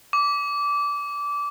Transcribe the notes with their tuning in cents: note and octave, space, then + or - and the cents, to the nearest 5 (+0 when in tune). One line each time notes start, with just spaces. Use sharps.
D6 -20